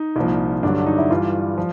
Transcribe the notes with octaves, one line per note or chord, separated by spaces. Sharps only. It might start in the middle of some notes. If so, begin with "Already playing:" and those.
Already playing: D#4
C2 A#2 F3
G2 D3 F#3 D4
D#4
E4
G2 E3 G3 F4
F3